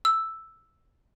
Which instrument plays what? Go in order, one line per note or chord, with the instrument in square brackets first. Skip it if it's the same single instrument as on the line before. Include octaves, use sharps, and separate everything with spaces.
[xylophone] E6